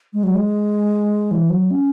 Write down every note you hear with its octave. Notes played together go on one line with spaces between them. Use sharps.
G#3
F#3
G#3
E3
F#3
C#4